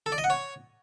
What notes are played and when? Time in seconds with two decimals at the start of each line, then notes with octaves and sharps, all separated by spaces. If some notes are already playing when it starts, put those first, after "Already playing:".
0.06 A4
0.12 D5
0.18 D#5
0.24 F#5
0.30 C#5